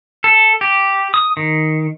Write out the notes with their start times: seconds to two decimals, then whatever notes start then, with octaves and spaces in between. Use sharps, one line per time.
0.24 A4
0.61 G4
1.14 D#6
1.37 D#3